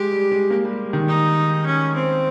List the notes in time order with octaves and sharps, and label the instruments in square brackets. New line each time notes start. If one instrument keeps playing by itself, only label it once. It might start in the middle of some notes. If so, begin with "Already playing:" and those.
Already playing: [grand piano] G#3 [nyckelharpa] G4
[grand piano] G3
G#3
A#3
G3
D#3
[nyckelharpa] D#4
C#4
C4